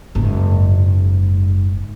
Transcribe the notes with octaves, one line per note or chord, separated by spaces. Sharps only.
F#1 G#2